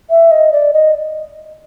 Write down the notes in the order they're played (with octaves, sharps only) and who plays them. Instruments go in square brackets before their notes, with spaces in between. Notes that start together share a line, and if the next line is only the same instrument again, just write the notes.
[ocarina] E5
D#5
D5
D#5